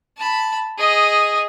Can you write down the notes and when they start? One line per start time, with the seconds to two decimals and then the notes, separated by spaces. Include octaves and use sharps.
0.17 A5 B5
0.78 G#4 D#5